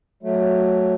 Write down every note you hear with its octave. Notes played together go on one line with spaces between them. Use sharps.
F#3 A3